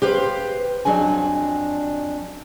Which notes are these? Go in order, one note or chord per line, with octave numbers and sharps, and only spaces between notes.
G4 B4 C5 F5
F2 F#3 D4 G#5